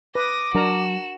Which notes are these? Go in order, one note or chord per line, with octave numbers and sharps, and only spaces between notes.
B4 D6 D#6 A#6
F#3 D4 F#4 A#4 A#5 E7